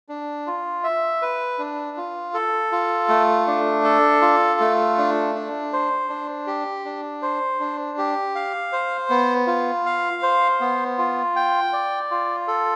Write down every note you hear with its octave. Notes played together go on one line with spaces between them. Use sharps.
D4
F4
E5
B4
D4
F4
A4
F4
A3
D4
A4
F4
A3
D4
D4
C5
D4
G4
D4
C5
D4
G4
F5
C5
B3
F4
F5
C5
B3
F4
G5
D5
F4
A4